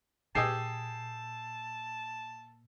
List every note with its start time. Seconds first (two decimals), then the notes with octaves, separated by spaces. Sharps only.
0.35 A#2 G4 G#4 D#5 A5 E6 C7